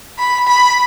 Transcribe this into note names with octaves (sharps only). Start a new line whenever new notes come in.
B5
B5